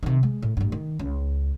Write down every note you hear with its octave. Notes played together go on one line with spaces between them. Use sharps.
C3 D#3
G#3
A2
A1 G2
D#3
C#2